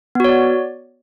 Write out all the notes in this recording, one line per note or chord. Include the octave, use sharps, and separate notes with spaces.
B3 F#4 C#5 D5